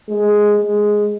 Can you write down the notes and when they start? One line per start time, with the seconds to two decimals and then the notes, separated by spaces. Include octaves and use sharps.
0.09 G#3
0.57 G#3